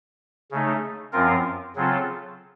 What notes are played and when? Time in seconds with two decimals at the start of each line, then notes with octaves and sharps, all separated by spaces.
0.51 C#3 A3 D#4
1.13 F#2 F3 C4 F4 A#4
1.76 C#3 F#3 C4 F4 A4